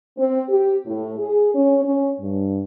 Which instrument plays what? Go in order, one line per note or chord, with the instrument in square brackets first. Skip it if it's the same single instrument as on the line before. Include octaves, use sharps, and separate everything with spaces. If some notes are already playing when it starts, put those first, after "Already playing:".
[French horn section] C4
G4
A2
G#4
C#4
C#4
G2